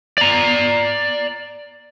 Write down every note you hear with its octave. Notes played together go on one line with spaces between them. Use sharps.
D5 A#5